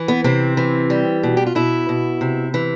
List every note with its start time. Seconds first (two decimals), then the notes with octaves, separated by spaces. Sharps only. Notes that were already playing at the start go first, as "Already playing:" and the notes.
Already playing: E3
0.08 B3
0.24 C3 C4
0.57 E3
0.90 G3
1.23 B2
1.37 G4
1.46 F4
1.55 B2 E4
1.89 B2
2.21 C3
2.54 E3